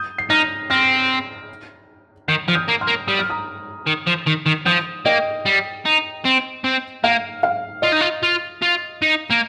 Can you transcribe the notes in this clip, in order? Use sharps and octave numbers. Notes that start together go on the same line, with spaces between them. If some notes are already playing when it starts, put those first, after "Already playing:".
Already playing: D#6 G6
C7
D#4 F6 A#6
C4 F6 A#6
D#3 G6 C7
F3 F6
D#6 G6
A#3
C6 F6
A#3
G3 D#6
F6
A#5 D#6
D#3
F3
D#3
D#3
F3 D#6 G6
A#3 D#5 G5
G3
D#4
C4
C4
A#3 F5
F5
F4 D#5
D#4
F4
F4
F4
D#4
A#3